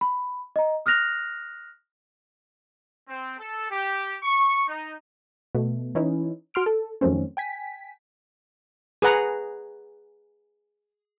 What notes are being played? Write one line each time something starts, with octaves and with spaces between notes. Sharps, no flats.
B5
D#5 A#5
D#6 F6 F#6 A#6 F7
C4
A4
G4
C#6
D#4
B2 A3
E3 C#4 D#4 E4
F#4 C6 F6 D7
A4
F2 D#3 F#3 A3 C4 C#4
G5 G#5 B6
G#4 B4 F#5 A#5